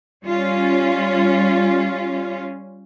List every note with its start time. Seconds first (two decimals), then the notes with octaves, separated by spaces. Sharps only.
0.24 G3 C#4 F4